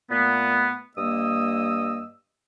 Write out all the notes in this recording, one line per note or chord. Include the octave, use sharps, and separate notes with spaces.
A#2 A3 B3
G2 A#3 D#5 D#6 E6